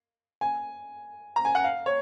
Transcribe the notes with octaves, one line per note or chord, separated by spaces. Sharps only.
G#5
A#5
G#5
F#5
F5
C#5